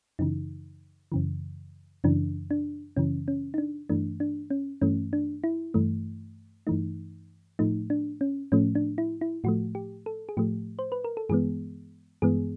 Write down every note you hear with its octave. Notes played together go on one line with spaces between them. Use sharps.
F#2 C#3 E3 D#4
F#2 C#3 E3
F#2 C#3 E3 D4
D4
F#2 C#3 E3 C#4
C#4
D#4
D4
G2 E3 A3 D4
D4
C#4
G2 E3 A3 C#4
D4
E4
G2 E3 A3
G2 E3 A3 D#4
A2 F3 A3 D#4
D4
C#4
A2 F3 A3 C#4
D4
E4
E4
A2 F3 A3 F#4
G4
A4
G#4
A2 F3 A3 G4
C5
B4
A#4
A4
G2 E3 G#3 B3 G#4
G2 E3 G#3 B3 G#4